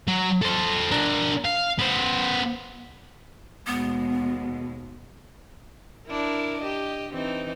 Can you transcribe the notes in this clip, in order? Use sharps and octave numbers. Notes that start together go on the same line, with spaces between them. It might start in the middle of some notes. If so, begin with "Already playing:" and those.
F#3
A4 C5
D4 A#4
F5
B3 C5
D#2 B2 G#3 B3
D4 E4 A#4
G4 D#5
E3 C4 D#4